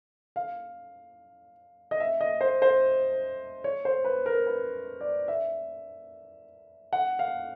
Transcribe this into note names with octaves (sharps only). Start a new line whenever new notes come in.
F5
D#5
E5
D#5
C5
C5
C#5
C5
B4
A#4
B4
D5
E5
F#5
F5